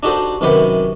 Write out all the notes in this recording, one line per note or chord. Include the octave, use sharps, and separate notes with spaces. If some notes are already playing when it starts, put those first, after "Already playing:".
D4 D#4 F#4 G4 A4 C5
F#2 C3 D#3 G4 B4 F#5